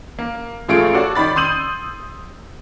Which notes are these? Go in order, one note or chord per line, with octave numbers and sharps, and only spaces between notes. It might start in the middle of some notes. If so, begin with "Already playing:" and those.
A#3
A#1 A3 F4 G#4 C#6 D7
F#4 A4 C#5 D5
D#3 D5 B5 A6
C6 D#6 E6 G6 D#7 F#7